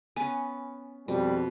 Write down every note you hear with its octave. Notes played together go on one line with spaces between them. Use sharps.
B3 C#4 G#5
F2 B2 G3